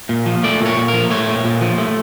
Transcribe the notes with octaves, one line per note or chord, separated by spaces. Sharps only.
A#2
F3
A3 D5
A#2
C#5
A#2
A#4
F3
A3 C#5
A#2
A#2
F3
A3